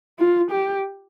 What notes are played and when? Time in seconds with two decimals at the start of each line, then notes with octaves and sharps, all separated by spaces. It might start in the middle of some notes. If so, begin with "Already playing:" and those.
0.19 F4
0.51 G4